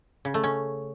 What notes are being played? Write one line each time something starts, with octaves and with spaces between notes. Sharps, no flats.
C#3
A3
C#4